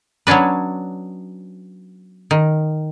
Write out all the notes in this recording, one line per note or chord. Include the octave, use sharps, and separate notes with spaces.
F#3 B3 C#4 D4 B4
D#3